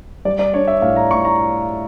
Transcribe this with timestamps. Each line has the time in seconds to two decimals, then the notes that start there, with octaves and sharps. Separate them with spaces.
0.25 G3 D5
0.39 D5
0.54 D4 C#5
0.68 E5
0.82 A2 F5
0.96 A#5
1.11 A2 C#6
1.25 A#5